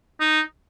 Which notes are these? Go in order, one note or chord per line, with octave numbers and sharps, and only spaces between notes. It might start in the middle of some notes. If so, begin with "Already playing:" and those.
D#4